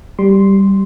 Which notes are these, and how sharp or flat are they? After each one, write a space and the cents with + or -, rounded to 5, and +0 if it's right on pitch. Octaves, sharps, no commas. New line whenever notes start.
G3 +0 C6 +0